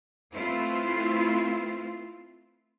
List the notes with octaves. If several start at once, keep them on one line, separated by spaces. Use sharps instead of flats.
A3 C4 E4 F4 B4